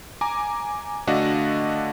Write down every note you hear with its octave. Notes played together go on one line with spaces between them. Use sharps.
G#5 A#5 D6
D3 A3 D4 F#4 D#5 F5